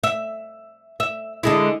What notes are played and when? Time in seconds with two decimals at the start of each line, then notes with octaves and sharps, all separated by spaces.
0.04 E5
1.00 E5
1.43 D3 G#3 E4